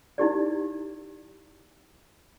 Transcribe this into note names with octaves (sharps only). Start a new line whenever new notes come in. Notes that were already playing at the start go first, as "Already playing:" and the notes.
D#4 E4 G4 D5